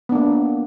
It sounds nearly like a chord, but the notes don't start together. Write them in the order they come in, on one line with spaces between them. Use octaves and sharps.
B3 D4 A#3